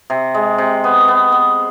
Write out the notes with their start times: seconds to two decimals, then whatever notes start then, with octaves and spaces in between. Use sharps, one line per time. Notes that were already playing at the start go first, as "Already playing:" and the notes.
0.10 C3
0.34 G#3
0.58 C3
0.84 B3
1.08 B3
1.32 B3